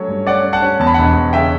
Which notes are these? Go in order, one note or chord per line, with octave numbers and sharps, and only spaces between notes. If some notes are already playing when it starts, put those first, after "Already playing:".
Already playing: F#3 A3 C#4 C#5
G2
C#4 D5 F#5
C#4
F#5 A5
C#4
E2 A5
B5
E1 F#5 A5
E1
C#3 E5 G5